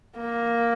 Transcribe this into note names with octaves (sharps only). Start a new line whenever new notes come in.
A#3